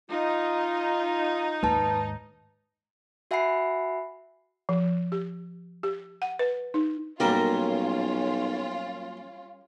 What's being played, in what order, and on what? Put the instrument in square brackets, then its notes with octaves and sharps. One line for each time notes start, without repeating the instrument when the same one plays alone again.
[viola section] D#4 [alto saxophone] F4
[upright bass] D#2 G#2 [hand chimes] B4 A5
[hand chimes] F#4 E5 F#5 G#5 B5 C7
[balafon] F3
G4
G4
F#5
B4
D#4
[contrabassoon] B1 [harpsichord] F#2 A#2 F#3 [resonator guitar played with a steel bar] G3 A#4 [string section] C#4 F4